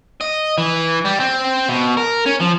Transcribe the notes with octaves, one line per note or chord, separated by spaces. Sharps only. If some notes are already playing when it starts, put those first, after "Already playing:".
D#5
E3
G3
C4
B2
A#4
C#4
F3